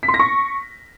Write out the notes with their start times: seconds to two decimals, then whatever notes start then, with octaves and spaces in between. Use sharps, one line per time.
0.03 B6
0.08 C6
0.14 A#6
0.19 C#6